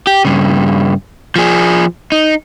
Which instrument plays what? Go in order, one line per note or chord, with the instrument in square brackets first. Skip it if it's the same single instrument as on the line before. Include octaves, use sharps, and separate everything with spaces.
[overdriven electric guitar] G4
G2 C#3
F3 G#4
D#4